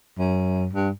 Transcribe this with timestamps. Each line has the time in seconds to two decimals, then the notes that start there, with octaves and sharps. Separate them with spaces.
0.19 F#2
0.73 G2